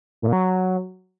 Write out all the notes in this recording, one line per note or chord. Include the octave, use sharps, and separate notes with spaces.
A2
A#2
F#3